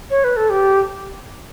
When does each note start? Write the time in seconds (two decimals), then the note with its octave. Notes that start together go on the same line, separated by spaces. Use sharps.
0.10 C#5
0.24 B4
0.37 A4
0.50 G4